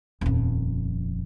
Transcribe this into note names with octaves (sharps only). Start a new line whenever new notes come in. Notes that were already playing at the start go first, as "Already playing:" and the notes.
D#1 F2